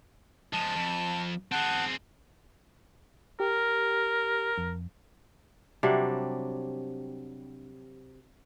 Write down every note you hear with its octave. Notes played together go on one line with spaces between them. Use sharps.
F3 G#3 A5
F2
C4 G#4 F#5 A5
G4 A#4
F2
C3 F#3 G3 D4